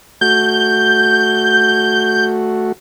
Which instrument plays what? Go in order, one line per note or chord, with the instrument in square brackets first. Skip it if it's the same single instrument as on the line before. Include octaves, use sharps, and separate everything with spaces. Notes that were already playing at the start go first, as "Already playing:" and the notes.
[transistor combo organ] A3 F#4 [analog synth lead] G6